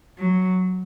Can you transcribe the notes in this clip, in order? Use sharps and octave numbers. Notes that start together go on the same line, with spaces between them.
F#3